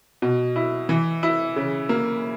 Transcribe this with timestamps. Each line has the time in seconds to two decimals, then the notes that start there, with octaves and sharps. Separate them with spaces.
0.22 B2
0.56 E4
0.89 E3
1.23 E4
1.56 C#3
1.89 A#3